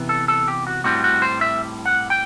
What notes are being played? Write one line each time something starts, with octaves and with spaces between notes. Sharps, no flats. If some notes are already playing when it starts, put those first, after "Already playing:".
Already playing: C3 E3 B3
A4
A4
G4
F#4
A2 G3 C4 F#4
F#4
C5
E5
F#5
G5